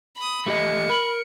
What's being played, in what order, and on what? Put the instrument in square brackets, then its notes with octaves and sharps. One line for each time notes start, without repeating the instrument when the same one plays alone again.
[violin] B5 D#6
[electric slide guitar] A3 G4 D#5 [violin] C#7
[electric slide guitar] A#4 [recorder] B5